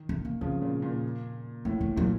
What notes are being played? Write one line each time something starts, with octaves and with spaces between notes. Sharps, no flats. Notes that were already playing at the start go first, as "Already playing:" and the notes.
Already playing: D#3
A3
A#3
C#3 F3 C4
A#2 C#3
A#2
A2 A#3
A3
A#2 F#3